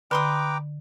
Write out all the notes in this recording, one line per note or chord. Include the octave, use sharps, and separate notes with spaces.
D3 B4 G5 A#5 C6 D6 D#6